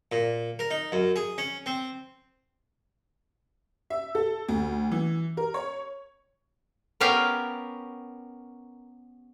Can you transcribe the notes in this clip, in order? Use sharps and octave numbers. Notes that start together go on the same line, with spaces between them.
A#2
A#4
D#4
F#2
G#4
C#4
C4
E5
A4
D2
E3
A#4
C#5
B3 C#4 G4 A#4 F5 G5